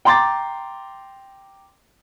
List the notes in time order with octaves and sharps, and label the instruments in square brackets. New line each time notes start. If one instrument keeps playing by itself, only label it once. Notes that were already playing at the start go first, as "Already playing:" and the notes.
[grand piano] G5 A#5 C6 D6 A6